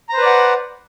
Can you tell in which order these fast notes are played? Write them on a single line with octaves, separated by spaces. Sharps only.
A#5 C5 B4 D5 F#5